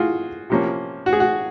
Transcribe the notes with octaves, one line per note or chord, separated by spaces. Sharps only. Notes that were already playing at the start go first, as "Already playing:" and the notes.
Already playing: F4 F#4 G#4
C3 F3 A#3 C#4
F#4
G#4
F#4